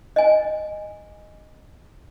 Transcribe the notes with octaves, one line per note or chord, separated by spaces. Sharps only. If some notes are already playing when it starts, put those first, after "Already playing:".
D#5 G#5